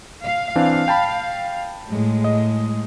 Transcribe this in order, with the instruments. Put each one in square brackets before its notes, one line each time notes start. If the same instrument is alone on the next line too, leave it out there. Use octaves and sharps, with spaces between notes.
[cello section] F5
[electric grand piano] E3 C4 D4
G5 A5 B5
[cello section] A2 G#3
[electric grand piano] D#5